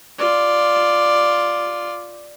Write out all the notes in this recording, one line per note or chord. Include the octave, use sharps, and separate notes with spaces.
F4 D5